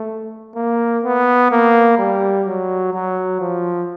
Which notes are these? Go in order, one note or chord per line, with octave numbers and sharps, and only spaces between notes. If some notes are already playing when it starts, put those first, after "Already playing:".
Already playing: A3
A#3
B3
A#3
G3
F#3
F#3
F3